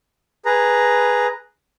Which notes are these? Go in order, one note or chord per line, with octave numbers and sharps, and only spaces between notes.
G#4 B4 A#5